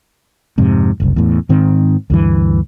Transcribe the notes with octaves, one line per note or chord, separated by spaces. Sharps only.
F2 G#2 C3
F#1 C2
E2 A2
G#2 D#3 C4
D2 G2 E3